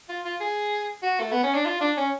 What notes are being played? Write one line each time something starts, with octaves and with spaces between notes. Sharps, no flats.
F4
F4
G#4
F#4
A3
B3
C#4
D4
F4
D4
C#4